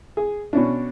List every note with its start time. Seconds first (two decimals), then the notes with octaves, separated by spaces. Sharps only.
0.17 G#4
0.53 B2 C#4 D4